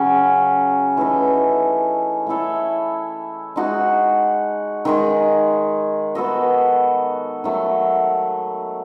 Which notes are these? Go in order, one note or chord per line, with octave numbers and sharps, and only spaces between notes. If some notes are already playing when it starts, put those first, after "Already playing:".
Already playing: C#3 F#3 C#4
E3 A3 D#4
A3 E4 A4 C#5
G#3 D#4 F#4
D#3 G#3 D#4
B3 F#4 A4 D#5
D#3 F#3 A3